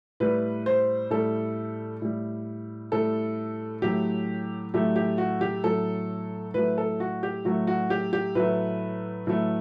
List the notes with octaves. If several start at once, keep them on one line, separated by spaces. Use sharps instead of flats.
A2 G3 B4
C5
A2 G3 A4
A2 G3
A2 G3 A4
A2 F#3 A3 G4
A2 F#3 A3 G4
G4
F#4
G4
A2 F#3 A3 A4
A2 F#3 A3 B4
A4
F#4
G4
A2 F#3 A3 F#4
F#4
G4
G4
A2 F#3 A3 B4
A2 F#3 A3